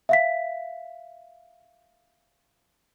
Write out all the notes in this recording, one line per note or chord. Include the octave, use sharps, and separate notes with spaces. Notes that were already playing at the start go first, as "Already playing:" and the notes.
E5 F5 B6